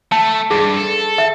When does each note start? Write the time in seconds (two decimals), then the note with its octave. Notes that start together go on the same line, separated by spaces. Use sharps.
0.12 A3 A5
0.51 G2 G#4
0.76 A4
1.18 E5